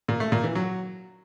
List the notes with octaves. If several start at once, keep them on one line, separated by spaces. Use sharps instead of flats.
A#2
A3
A#2
E3
F#3